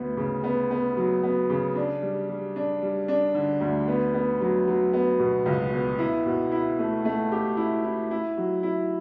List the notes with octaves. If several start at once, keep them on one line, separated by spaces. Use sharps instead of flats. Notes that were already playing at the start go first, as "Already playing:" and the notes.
Already playing: D2 B3
C#3
B3
B3
F#3
B3
C#3
D4
G3
G3
D4
G3
D4
D3
D2
B3
B3
F#3
F#3
B3
B2
C#2
B3
E4
B2
E4
A3
A3
G4
E4
E4
E4
F#3
E4